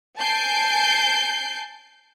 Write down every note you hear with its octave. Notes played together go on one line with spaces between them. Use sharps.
G#5 A5 G6 C7 D7